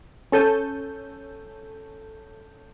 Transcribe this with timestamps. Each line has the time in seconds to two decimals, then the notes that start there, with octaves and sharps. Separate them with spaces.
0.32 C#4 A4 G6 D#7